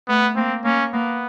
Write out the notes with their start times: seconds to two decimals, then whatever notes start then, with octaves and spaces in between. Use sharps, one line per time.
0.08 A3 B3
0.36 A#3 C4
0.65 A#3 C#4
0.93 A#3 B3